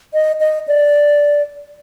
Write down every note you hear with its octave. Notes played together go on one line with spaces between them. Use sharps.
D#5
D#5
D5